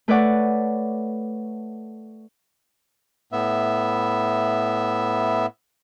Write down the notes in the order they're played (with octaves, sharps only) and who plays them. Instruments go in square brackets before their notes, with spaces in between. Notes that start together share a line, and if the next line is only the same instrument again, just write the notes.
[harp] A3 B4 C#5 D5 F#5
[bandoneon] A2 B3 E5